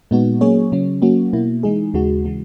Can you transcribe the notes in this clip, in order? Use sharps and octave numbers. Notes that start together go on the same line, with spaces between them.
A#2 G#3 B3 D#4 F#4
F#3 A#3 C#4 G#4 C#5
C#3 F#3 C#4
F#3 A#3 C#4 F#4
B2 A#3 E4
E3 G#3 D#4 G#4
D#2 C#3 G#3 D#4 F#4
C#3 E3 G#3